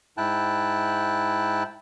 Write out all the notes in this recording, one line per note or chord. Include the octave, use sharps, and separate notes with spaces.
G#2 E4 G5 A5 F#6